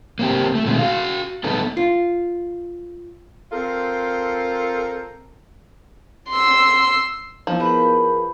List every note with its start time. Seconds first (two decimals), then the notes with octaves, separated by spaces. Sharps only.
0.19 A#3 C4 G4
0.55 A3
0.66 B2 D#3 G#3 A3 C4
0.79 F#4 F5
1.44 A3 B3 D#4 A4 B4
1.77 F4
3.52 C4 F4 A4 A#4
6.31 C6 E6
7.47 F3 B3 D#4 E4
7.60 G#4 A#4 B4 G6